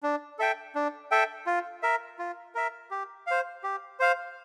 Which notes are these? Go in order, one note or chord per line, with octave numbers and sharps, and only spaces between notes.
D4
A4 E5 G5
D4
A4 E5 G5
F4
A#4 E5
F4
A#4 E5
G4
C5 F5
G4
C5 F5